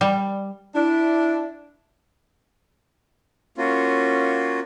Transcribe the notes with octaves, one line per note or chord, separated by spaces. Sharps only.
G3
D4 E4
A#3 C#4 F4 F#4